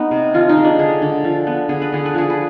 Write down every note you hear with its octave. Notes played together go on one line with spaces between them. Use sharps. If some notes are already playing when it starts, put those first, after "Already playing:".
Already playing: G#3 B3 D#4
C3
F3 F4
D#4
G#3
D4
D3 G#4
D3
F3
B3
D3 G#4
B4
D3 G#4
B4
F3 G#4
B4